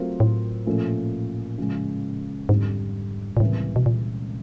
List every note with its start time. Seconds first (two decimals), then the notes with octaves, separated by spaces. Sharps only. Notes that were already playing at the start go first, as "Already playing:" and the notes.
Already playing: F#3 A3 C4 F4 A#4
0.20 A2
0.66 A#2 F3 A3 C#4
1.58 C#3 F3 G#3
2.49 F2 G#2 D3 G3
3.37 A#2
3.40 C#2 A2 C3 E3 G3 A#3
3.76 B2
3.86 A#2